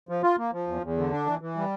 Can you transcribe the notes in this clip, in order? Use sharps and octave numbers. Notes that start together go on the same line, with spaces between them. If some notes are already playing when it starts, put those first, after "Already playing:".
F3
F4
A#3
F3
E2
E2
D3
D4
E3
E3
G3